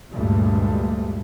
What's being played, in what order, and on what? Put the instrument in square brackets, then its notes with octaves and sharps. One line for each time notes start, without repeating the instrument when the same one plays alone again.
[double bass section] D2 G2 A#2 G#3 A3